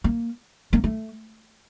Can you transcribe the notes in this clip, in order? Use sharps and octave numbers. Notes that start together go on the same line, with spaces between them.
A#3
A#3
A3